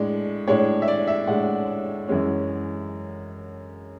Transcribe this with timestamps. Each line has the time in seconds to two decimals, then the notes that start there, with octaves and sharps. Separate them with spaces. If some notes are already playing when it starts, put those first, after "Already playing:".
Already playing: A2 G#3 D4
0.48 A2 G#3 D4 C#5
0.82 E5
0.88 D5
1.08 E5
1.27 A2 G#3 D4 F#5
2.08 F#2 E3 G#3 C#4